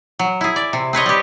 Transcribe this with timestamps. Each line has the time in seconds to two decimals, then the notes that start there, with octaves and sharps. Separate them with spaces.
0.19 F#3
0.41 E4 G#4
0.56 D5
0.73 C3
0.93 C4 B4 C#5 D#5
1.06 G3 G4